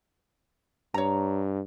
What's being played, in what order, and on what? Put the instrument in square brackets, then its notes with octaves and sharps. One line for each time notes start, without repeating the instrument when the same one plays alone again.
[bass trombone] G2 [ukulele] C#5 A#5